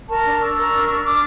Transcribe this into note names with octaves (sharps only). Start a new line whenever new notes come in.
A#4 A5 C#6
D4 F6
D4 C#6 E6
A#4
D4
D4
D4 D6 F6